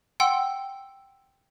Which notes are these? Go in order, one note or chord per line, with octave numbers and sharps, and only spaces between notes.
F#5 G5 C6 E6